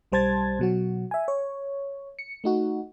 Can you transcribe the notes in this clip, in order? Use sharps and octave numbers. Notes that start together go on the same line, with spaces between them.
B1 G3 C5 A5 G#6 A6
B2 F#3 F#4
E5 G#5
C#5
C#7
A3 D#4 F#4